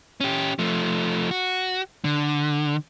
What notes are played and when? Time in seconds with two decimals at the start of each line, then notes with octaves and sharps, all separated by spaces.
0.21 C#4 G4
0.59 F3 A3
1.31 F#4
2.04 D3